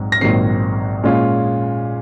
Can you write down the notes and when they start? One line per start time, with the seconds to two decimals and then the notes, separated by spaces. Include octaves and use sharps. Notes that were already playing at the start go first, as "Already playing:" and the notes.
Already playing: A#1 G#2 F#3 C4
0.12 A#6
0.21 A#1 G#2 D#3 F#3 C4 C7
1.03 A#2 G#3 C#4 F4